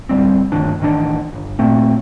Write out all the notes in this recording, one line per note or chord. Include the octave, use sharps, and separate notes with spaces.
D1 D2 G3 C4
D2 G2 D#3 D4
A1 D#3 D4
G1
A#2 A3 C4